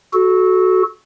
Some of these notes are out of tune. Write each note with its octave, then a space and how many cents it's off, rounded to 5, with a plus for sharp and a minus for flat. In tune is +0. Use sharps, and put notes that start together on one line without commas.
F#4 +0 A4 -25